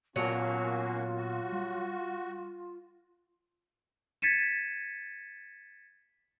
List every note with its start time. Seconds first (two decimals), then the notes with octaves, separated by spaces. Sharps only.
0.16 A#2 F#3 A#3 B3 C#4 F4 F#4 A5
1.15 F#4
1.52 G3
4.22 G#6 A6 B6 C#7 D#7 E7